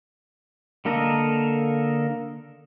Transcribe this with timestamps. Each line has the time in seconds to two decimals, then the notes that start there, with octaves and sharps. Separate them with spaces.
0.85 D3 A#3 A4 A#4 D#5